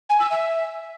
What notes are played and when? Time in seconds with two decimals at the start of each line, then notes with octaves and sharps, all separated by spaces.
0.10 G#5
0.20 E6
0.31 E5